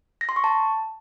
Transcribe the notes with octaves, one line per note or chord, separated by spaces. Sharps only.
A#6
C6
C#6
A5